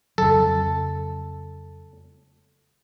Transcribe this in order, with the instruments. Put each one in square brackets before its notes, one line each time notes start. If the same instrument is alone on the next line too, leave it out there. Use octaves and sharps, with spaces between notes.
[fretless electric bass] F2 C#3 F#3 [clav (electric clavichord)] A4